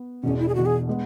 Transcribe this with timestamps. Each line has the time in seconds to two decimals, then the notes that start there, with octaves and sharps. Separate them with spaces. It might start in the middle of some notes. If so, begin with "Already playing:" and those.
Already playing: B3
0.23 E1 E2 B2 C#4
0.40 E4
0.49 G#4
0.55 E1 E2 B2 F#4
0.66 G#4
0.89 G#3 B3